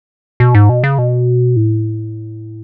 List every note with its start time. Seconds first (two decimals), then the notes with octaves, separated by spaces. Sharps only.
0.40 B2
0.55 G#2
0.69 B2
0.84 C#3
0.98 B2
1.56 A2